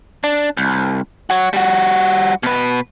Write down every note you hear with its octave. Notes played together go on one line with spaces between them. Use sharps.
D4
C2
F#4 C#5
G3 F#4
B2 B4